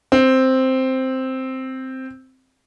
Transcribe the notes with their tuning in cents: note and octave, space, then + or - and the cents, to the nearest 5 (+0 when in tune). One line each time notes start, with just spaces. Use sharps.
C4 +0